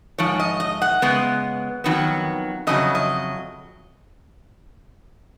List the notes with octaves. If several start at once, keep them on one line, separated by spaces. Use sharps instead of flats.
G#2 F3 C#5
D#5
D#5
F#5
C#3 G#3 B3
F2 D#3 F#3 B3
F2 C#3 F#3 D#5
D#5